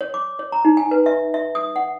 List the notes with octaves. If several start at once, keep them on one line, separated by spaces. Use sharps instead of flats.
C#5
D6
C#5
A#5
D#4
G#5
B4
E5
E5
D#6
F#5